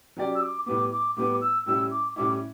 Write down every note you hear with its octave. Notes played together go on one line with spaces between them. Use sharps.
F#3 C#4 G4 D5
E6
D6
A2 G3 B3 D6
D6
A2 G3 B3 D6
E6
A2 G3 C#4 E4 E6
D6
A2 G3 C#4 E4 D6